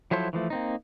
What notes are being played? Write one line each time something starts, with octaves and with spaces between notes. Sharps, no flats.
F3 F#3 E4 A4 C5
E3 F3 A3
A#3 C4 D#4